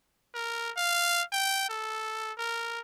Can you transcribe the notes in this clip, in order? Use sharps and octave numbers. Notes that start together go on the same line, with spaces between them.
A#4
F5
G5
A4
A#4